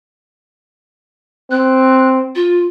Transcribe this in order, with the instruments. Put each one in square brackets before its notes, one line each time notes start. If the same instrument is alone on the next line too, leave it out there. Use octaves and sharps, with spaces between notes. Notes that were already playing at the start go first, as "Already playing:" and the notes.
[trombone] C4 [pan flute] F#6
[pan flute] F4